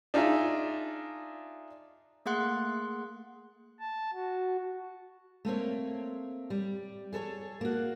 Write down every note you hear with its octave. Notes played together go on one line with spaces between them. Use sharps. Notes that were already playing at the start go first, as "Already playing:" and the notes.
D4 D#4 F4 G#4 E5
A3 A#3 G#4 F#5 C6 F#6
A5
F#4
A3 A#3 C4 C#5
G3
G#4 A4 C5 C#5
A#3 F#4